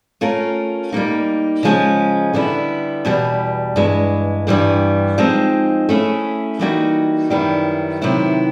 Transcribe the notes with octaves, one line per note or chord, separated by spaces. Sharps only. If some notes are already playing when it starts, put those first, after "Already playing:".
A3 C#4 F4 A#4
G3 A#3 D#4
C#3 F3 G#3 C#4
D3 G3 B3 E4
E2 B2 G3
G2 E3 G#3
G2 E3 G3 B3
F3 G#3 C4 D#4
A3 C#4 E4 G#4
E3 G3 A#3 D#4 F#4
F#2 D#3 G3 B3 E4
C3 D#3 F#3 B3 E4